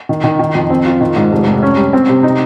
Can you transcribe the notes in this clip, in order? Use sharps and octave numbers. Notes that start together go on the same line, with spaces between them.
D#3
D#3
D#3
F2
C4
F4
D#3
G#2
F1
F1
C#4
G3
C4
C3
D#4